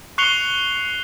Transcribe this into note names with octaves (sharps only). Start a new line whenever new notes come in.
C#6 F#6 C7 C#7 F7 G7